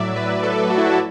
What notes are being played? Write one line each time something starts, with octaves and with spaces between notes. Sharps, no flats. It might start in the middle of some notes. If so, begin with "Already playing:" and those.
Already playing: A2 F#3 D5 E5
B4
A4
F#4
E4
F#4